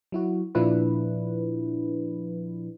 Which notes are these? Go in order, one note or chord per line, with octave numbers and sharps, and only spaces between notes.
F#3 E4 F#4
A#2 F3 D4 E4 B4